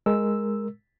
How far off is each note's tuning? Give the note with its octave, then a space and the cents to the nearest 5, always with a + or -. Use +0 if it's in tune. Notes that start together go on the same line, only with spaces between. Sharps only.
G#3 +0 A#4 +0 E6 +0